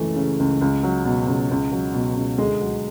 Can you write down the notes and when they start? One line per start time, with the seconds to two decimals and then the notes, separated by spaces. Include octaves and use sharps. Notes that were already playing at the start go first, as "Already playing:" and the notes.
Already playing: C#2 F#2 E3 A3
0.16 C#3
0.39 C#2
0.61 C#2
0.83 F#3
1.05 B2
1.27 C#2
1.50 C#2
1.72 F#3
1.94 B2
2.16 C#2
2.38 D2 G#3
2.61 F#3